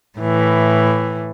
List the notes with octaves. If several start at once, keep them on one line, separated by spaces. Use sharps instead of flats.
A2 E3